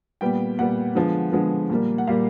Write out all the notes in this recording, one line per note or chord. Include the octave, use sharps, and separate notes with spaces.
A#2 G3 B3 G5
A#2 G3 B3 F#5
D3 F3 G#3 B3
D3 F3 G#3 B3
A#2 G3 A#3
F#5
A#2 G3 A#3 F5